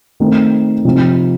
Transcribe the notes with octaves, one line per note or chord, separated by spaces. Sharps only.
D#3 A3 C4 D#4
C3 F3 C4 D#4